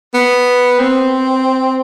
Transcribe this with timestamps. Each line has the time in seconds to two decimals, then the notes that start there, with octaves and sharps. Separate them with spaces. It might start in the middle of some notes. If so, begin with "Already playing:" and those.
0.14 B3
0.79 C4